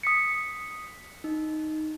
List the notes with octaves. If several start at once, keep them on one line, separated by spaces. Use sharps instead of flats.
D#6 B6 C#7
D#4